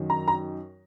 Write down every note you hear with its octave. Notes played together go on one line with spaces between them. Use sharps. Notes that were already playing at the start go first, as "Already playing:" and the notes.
Already playing: F#2 D#3 F#3
A#5
A#5